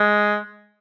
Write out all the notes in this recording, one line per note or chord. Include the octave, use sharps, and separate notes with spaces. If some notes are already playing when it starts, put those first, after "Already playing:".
Already playing: G#3